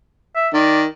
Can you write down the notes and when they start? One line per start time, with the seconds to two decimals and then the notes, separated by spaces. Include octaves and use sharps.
0.36 E5
0.54 D#3 D5